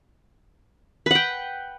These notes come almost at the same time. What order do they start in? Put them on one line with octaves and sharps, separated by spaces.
B4 F#5 G5